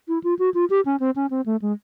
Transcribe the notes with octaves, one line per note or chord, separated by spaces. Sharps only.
E4
F4
F#4
F4
G4
C#4
C4
C#4
C4
A3
G#3